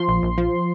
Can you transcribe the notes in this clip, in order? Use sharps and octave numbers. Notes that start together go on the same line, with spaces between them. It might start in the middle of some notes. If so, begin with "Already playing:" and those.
Already playing: F3 C6
A#1
A#1
F3